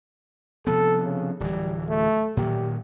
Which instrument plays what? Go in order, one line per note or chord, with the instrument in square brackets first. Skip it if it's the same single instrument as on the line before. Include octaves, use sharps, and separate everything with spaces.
[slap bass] C3 F3 B3 [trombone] A4
[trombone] C#3
[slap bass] D1 E3 [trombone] G3
[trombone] A3
[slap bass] A#2 D#3 F#3 [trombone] G4